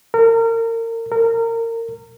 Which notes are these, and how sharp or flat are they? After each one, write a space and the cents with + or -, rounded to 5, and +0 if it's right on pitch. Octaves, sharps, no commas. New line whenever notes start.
A#4 -30
A#4 -25